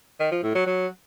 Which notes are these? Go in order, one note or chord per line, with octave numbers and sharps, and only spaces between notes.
D#3
F3
A2
F#3
F#3